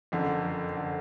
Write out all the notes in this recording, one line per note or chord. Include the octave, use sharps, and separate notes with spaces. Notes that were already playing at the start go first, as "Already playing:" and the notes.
F#1 F2 D3
D3